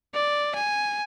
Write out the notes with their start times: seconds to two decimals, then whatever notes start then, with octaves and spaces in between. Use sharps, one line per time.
0.14 D5
0.55 G#5